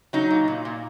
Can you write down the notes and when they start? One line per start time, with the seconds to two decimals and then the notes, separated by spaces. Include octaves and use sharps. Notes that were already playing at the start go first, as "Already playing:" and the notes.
0.13 F#3 D#4
0.30 A#2
0.48 A#2
0.65 A#2